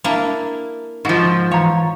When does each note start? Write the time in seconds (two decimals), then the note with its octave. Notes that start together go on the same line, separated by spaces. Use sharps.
0.04 A#3 D4 E4
1.05 G#2 F3 F#4
1.51 E3 C#5 F5 A#5